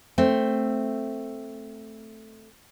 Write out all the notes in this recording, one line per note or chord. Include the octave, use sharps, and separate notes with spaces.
A3 C4